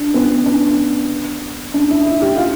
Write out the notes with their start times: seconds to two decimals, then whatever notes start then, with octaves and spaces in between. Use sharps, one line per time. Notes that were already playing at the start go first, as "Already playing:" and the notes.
Already playing: D4
0.14 B3
0.46 D4
1.74 D4
1.90 E4
2.06 E4
2.22 G4
2.37 F4